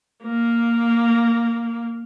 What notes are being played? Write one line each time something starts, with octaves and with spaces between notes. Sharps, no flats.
A#3